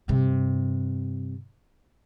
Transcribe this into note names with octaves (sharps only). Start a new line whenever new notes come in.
G2 C3